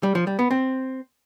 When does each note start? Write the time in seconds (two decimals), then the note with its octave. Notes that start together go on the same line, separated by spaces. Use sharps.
0.03 G3
0.15 F3
0.27 G3
0.39 B3
0.51 C4